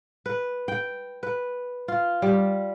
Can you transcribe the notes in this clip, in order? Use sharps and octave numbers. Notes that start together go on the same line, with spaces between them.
B4
G5
B4
F4
G3